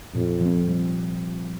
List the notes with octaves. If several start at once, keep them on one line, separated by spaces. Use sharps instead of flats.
F2 A#2
F3 C4
G3